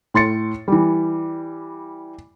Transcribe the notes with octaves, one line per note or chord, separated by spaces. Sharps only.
A2 C6 A6 C#7
E3 G3